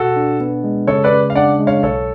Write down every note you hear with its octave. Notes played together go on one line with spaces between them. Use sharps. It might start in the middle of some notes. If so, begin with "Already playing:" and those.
Already playing: B2 F#4 A4
D4
B3
G#3
C#3 A4 C#5
B4 D5
C#3
F5
D4 D5 F#5
G#3
C#5 F5
B1 A4 C#5